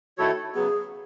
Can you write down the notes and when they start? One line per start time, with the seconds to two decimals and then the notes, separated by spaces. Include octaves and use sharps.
0.18 D#3 A3 E4 F#4 A4 C#5
0.55 C#3 F#3 B3 G#4